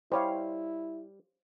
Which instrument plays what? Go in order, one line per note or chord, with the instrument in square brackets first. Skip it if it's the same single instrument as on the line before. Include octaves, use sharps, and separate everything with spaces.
[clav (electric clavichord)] G3 [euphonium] E4 [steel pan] C5 C#5 F5